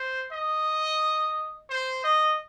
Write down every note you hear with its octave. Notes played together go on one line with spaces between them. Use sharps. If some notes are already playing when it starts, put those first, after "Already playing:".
Already playing: C5
D#5
C5
D#5